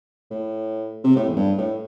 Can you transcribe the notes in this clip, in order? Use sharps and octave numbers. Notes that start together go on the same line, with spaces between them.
A2
C3
A2
E2
G2
A2